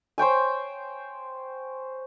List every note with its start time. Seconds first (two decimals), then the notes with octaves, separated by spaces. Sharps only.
0.18 C5 C#5 G5 G#5